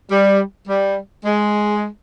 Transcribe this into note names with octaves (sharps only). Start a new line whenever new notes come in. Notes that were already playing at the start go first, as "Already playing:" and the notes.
G3
G3
G#3